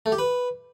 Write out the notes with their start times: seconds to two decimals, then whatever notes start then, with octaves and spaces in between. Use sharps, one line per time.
0.06 A3
0.12 G4
0.19 B4